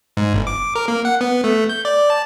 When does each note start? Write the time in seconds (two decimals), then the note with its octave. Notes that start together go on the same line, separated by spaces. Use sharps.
0.17 G#2
0.34 G1
0.47 D6
0.75 A#4
0.88 A#3
1.05 F#5
1.21 B3
1.44 A3
1.69 G6
1.85 D5
2.10 A5